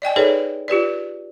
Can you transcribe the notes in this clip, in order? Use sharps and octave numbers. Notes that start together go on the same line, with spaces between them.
D5 D#5 G5 G#5
D#4 G#4 A4 B4 C#5 D5
F4 G4 B4 D5